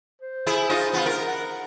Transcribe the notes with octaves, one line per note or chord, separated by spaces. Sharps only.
C5
E4 G#4
D#4 F4 D#5
B3 F4
A#4
F#5